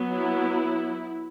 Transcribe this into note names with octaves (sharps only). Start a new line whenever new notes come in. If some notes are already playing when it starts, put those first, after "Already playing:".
Already playing: F#3 B3
E4